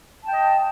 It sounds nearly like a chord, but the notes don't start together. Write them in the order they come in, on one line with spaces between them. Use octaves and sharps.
A5 G5 D#5